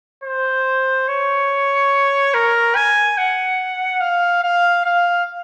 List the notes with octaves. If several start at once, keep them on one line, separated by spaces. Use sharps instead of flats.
C5
C#5
A#4
G#5
F#5
F5
F5
F5